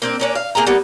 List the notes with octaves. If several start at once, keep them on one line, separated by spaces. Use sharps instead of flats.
A#3 C4 D4
A#3 C#4 D4
F5
A#3 G#4 G5 A#5
G3 A#3 B3